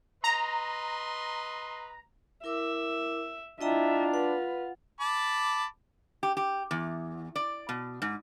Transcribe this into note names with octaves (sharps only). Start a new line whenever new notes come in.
B4 D#5 A#5 C6
E4 A#4 E5 D6
D4 E4 F4 D#5 E5 G5 A#5
B4 F#5
A5 B5 D6
G4
G4
E2
D5
B2
G#2